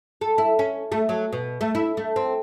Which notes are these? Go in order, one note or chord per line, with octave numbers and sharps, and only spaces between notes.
A4
E4
C#4
A3
F#3
B2
A3
E4
A3
C4